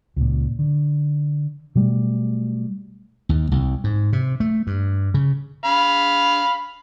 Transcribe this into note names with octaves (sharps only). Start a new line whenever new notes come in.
C#2 A#2
D3
B2 F#3 G3 A3
D#2
C2
G#2
C3
A3
G2
C#3
F5 B5